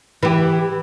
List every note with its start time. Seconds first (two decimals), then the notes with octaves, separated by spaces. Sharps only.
0.23 E3 G4